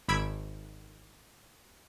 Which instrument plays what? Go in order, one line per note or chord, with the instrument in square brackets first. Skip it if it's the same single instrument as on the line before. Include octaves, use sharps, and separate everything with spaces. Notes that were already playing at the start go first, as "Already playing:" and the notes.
[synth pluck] G#1 B5 E6 G#6 D7